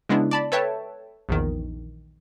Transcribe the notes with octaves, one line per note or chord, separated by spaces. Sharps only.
C#3 G#3 B3 D4 E4
D5 A5 B5
A4 B4 C#5 E5 G5 A5
A#1 E2 D#3